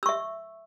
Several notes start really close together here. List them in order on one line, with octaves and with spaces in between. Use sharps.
E6 C#6 E5